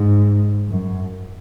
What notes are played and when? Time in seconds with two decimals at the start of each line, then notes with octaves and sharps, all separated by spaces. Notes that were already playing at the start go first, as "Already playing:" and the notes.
Already playing: G#2
0.69 F#2